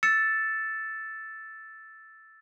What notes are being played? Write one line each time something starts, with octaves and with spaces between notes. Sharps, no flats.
E6 A6 C#7 E7